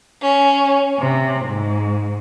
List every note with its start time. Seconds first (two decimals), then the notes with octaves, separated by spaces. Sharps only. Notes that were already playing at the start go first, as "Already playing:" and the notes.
0.22 C#4
0.98 C3
1.43 G#2